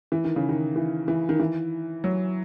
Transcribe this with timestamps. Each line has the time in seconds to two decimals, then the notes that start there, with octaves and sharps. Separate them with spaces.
0.12 E3
0.24 D#3
0.36 C#3
0.49 D#3
0.76 E3
1.08 E3
1.29 D#3
1.40 E3
2.04 F#3